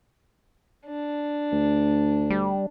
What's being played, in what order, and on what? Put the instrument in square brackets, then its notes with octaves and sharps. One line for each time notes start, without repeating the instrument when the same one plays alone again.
[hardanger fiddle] D4
[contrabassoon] D2
[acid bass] G3